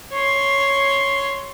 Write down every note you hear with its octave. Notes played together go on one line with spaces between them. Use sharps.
C#5 C6